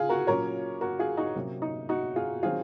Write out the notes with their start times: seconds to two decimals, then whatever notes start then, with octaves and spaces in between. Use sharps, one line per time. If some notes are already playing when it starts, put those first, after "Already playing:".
Already playing: C#3 F4 G#4
0.09 F#4 A#4
0.27 A#2 F#3 C#4 A#4 C#5
0.81 F#4 A#4
0.99 F4 G#4
1.17 D#4 F#4
1.35 C3 F#3 A#3 C#4
1.62 D#4
1.89 D#4 F#4
2.16 F4 G#4
2.43 D#3 F#3 C4 F4 G#4